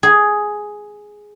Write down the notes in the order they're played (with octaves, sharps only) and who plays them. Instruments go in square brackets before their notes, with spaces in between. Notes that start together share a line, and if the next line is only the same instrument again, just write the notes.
[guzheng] G#4